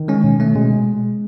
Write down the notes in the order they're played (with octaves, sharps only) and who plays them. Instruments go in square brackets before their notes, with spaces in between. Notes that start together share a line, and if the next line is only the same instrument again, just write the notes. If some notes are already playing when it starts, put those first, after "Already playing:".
Already playing: [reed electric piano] D#3
[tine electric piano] G#3 C#4
B2
A3 C#4
[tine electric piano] B2 [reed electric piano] G#3